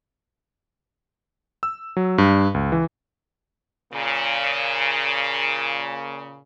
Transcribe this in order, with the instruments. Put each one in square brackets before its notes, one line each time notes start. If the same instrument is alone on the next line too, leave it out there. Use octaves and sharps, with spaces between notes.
[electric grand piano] E6
F#3
G2
C#2
E3
[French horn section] A#2 C#3